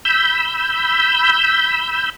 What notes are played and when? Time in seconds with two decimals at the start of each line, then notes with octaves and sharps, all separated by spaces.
0.05 B5 E6 G6